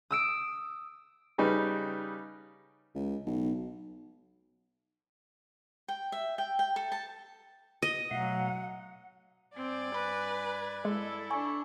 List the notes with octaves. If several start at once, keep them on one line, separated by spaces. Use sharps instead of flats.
D#6 E6 D7
C#3 G3 D#4 B4
C#2
B1
G5
E5
G5
G5
A4
A5
D#5
B2 F#3 A3 F5 F#5
G2 C4 D5 G#5
B4 B5
G#3 E4 A4
D4 G#5 C#6